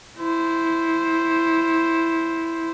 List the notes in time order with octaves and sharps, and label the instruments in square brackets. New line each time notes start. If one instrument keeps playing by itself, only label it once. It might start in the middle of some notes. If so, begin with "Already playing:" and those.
[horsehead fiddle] E4 C5